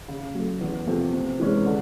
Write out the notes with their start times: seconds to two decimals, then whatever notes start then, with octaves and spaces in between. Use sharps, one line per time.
0.08 C#3
0.35 F#3 A3
0.61 E2
0.87 C3 F3 A3
1.13 C3
1.40 E3 G#3 C#4
1.66 D3